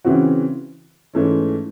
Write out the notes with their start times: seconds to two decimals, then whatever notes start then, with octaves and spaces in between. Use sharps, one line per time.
0.04 C#3 E3 C4 F#4
1.14 G#2 E3 A3 C#4